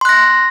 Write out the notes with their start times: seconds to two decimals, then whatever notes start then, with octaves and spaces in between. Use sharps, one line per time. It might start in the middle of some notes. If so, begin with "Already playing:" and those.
0.01 C6
0.05 F#6
0.09 A#6